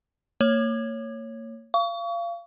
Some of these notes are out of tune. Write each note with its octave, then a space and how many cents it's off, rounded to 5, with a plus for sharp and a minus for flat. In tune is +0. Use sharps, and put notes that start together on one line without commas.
A#3 -30 C#5 +0
F5 -25 C#6 +35